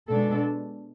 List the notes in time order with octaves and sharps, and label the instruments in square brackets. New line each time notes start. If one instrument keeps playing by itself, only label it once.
[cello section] B2 G#3 D4 A4